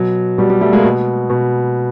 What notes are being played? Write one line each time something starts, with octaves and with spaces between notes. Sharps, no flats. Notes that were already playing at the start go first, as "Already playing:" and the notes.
Already playing: B2 F#3
B2 G3
G3
G3 A3
G#3 A#3
B2
B2